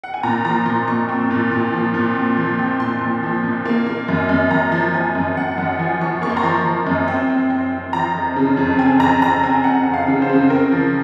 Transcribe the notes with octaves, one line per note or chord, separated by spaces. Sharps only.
F#5
G#5
A#2 A#5
F3 A#5
A#2 C6
A#2 C#6
C4
A#2
A#2
F3
A#2
C4
F3
C4
A#2 C6
A#2
F3
A#2
A#3
A#3
F#2
F#2
F#2 A#5
F3
F3 G#5
F#2
F#2 F#5
F#2 F#5
F3 G#5
F3 C#6
A#3 C#6
C6
A#5
F3 C6
F3
F#2
C4
C4
C4
C4
F3 A#5
F2
C#3
F2
C4 G#5
F2 A#5
F2 A#5
C4 G#5
C4 F#5
F2
F5
C#3
C5
C#3
C4 A#4
F3